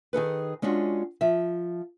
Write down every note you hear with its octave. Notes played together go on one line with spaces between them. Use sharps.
D#3 G#4 A4 B4
G#3 C#4 D4 F4 F#4
F3 E5